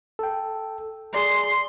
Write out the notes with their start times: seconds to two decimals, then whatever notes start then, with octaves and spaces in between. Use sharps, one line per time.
0.19 A4 G5
1.14 G#4 D5 C6